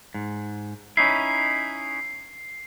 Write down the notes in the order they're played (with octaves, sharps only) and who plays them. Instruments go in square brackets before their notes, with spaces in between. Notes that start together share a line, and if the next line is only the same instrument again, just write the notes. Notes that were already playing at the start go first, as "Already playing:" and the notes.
[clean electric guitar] G#2
[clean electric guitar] C#4 D#4 E4 [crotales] C7